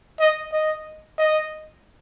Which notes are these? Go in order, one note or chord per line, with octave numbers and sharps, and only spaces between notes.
D#5
D#5
D#5